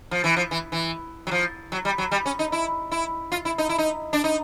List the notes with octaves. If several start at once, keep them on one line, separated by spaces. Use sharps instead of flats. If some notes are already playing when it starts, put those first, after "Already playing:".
F3
E3
F3
E3
E3
F#3
F3
F#3
G3
F#3
G3
C#4
D#4
E4
E4
F4
E4
D#4
E4
D#4
D4
D#4